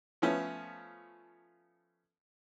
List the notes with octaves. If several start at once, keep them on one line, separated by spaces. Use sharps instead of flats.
F3 A3 B3 C#4